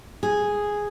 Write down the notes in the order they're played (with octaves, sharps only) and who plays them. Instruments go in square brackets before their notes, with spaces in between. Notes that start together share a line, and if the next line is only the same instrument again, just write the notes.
[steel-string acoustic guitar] G#4